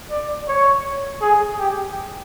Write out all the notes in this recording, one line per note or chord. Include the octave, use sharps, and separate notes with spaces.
D5
C#5
G#4
G4